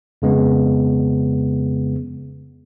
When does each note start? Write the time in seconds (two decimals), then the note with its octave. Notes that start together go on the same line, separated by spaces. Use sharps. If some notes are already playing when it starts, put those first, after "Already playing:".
0.22 F2 C#3 G#3 B3